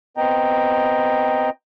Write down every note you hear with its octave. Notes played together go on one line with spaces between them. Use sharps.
B3 C4 D#5 G5 A#5